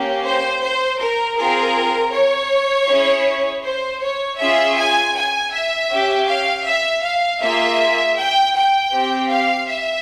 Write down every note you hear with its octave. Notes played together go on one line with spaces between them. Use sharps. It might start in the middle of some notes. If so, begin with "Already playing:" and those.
Already playing: A#3 C#4 G4
C5
C5
A#4
C4 F4 G#4 A#4
C#5
C#4 E4 G#4
C5
C#5
C#4 F4 G#4 E5
G#5
G#5
E5
C#4 G4
F5
E5
F5
A#3 F4 G#4 E5
G5
G5
C4 G4
F5
E5